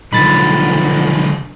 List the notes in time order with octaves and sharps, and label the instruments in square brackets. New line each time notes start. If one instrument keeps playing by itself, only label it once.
[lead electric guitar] B1 D3 [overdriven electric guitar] F3 D#4 [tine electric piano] B5 A6